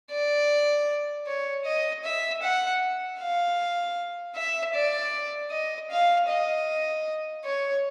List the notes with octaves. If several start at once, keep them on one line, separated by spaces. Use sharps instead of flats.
D5
C#5
D#5
E5
F#5
F5
E5
D5
D#5
F5
D#5
C#5